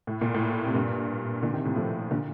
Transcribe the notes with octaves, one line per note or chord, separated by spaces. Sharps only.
A2
A#2
A2
C3
G2 A#2
A#2 D3
C3 D#3
A2 C3
F3 A3
A#2 D3